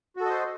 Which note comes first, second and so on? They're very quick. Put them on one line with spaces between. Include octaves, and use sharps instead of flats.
F#4 A4 D#5 C5